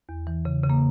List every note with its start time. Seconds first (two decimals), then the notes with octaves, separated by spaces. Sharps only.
0.09 E2
0.27 E3
0.45 C#3
0.64 C#3
0.70 A#3